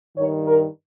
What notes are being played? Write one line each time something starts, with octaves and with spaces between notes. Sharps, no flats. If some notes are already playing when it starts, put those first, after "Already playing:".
G2 D#3 C#5
A#4